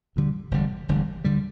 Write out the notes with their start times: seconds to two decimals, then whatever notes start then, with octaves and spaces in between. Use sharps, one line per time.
0.16 E1 D2 D3 G3
0.51 E1 D2 D3 G3
0.88 E1 D2 D3 G3
1.24 D2 D3 G3